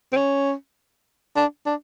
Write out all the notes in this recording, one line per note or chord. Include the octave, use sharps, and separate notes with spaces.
C4
C#4
D4
D4